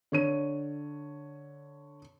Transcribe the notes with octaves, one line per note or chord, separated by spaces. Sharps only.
D3 C#5 D#7